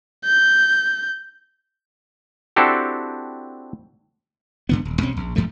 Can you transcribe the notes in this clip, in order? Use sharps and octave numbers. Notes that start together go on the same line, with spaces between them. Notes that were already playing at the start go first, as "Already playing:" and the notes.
G6
C4 D4 E4 F#4 G4 A4
G2 D3 B3
D#1
B1 C4 C#4
A#1
E1 G2 F3 A3